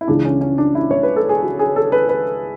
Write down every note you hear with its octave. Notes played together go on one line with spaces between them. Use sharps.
E4
C#2 C#3 E3 D4
C#4
C#4
D4
E4
C#5
B4
A4
G#4
F#4
G#4
A4
B4
B4